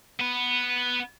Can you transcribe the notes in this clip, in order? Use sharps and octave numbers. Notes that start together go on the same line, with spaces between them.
B3 B4